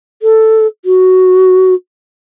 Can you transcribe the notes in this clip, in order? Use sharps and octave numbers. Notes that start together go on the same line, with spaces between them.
A4
F#4